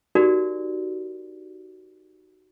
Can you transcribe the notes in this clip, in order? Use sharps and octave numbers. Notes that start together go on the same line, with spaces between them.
D#4 F#4 G4 A#4 D5